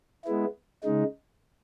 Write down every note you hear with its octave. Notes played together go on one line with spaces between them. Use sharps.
G#3 B3 E4
C#3 G#3 D#4